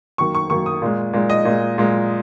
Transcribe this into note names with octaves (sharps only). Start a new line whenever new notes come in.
F#2 D#3 A#3 C#6
C#6
F#2 D#3 A#3 C#6
D#6
A#2 G#3
A#2 G#3
D#5
A#2 G#3
A#2 G#3